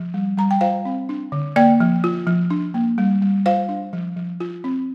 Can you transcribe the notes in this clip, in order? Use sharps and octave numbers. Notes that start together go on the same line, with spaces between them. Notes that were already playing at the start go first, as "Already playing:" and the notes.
Already playing: F3
G3
G3 A#5
G5
F4 C5 F5
C4
D4
D3
A#3 D5 G5
F3
F4
F3
D4
A#3
G3
G3
F4 C5 F5
D4
F3
F3
F4
C4